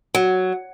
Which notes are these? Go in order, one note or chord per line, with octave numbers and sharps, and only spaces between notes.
F#3